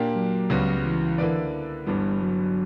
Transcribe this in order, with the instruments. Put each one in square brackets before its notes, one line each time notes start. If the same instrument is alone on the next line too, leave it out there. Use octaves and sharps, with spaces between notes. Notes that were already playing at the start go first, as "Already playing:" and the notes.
Already playing: [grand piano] A#2 A#3 D4 G4
[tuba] F#3
[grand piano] C#2 C#3 G3 B3 F#4
[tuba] E3
[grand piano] D3 A#3 E4 B4 D5
[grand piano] G1 G2 E3 B3 [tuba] G3
[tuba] F#3